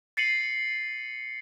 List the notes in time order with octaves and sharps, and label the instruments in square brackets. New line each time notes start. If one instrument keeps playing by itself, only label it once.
[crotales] A6 C7 C#7 D#7 F#7